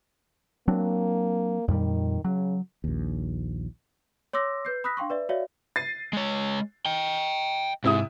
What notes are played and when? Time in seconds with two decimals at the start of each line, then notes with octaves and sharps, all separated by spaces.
0.68 F#3 A#3 C4 D4
1.68 F2 A#2 D#3 G3
2.25 C#3 F#3
2.84 A#1 D#2
4.33 C#5 C6 D6 E6 A#6
4.65 B4 G6 C7
4.84 B5 D#6 E6 F#6 A#6 B6
4.97 D4 F5 G5 C6 C#6
5.10 B4 D5 E5
5.29 F#4 C#5 D5 E5 F5
5.76 A6 C7 D#7
6.13 G#3 C#5
6.86 D#5 G5
7.84 G#2 C3 E4 D#6